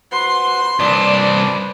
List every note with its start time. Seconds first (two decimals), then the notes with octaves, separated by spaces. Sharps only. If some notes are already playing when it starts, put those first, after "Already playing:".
0.12 F#4 B4 C5 C6
0.80 C2 D4 B4 C5 D5